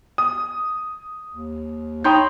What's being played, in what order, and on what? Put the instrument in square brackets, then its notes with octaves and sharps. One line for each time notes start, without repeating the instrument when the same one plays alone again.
[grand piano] D#6
[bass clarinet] D#2
[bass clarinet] D#4 [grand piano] C#5 G5 D#6 [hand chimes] B5 C6 G6